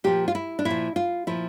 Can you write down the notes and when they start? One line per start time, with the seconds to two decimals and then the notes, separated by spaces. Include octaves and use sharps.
0.04 A#2 F3 G4
0.28 F4
0.35 E4
0.59 D4
0.65 A#2 E4
0.70 F3
0.96 F4
1.27 A#2 F3 E4